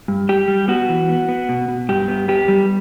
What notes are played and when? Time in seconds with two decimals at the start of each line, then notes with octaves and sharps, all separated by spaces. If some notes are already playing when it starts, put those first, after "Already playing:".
0.08 G2
0.29 G3 G4
0.48 G3
0.68 B3 F#4
0.89 E3
1.09 B3
1.29 B3
1.49 B2
1.68 B2
1.89 G2 G4
2.08 B3
2.28 B3 G4
2.48 G3